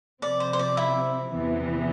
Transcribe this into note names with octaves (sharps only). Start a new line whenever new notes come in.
C3 F3 C4 D5
C5
C5
D5
E4 E5
E2 C3 E3 B3